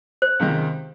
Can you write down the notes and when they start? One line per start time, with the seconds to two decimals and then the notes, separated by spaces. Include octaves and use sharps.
0.22 C5
0.39 C#2 C3 D#3 G#3